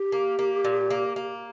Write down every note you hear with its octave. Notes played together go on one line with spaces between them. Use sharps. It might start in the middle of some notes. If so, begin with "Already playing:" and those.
Already playing: G4
A#3
A#3
A#2
A#3
A#3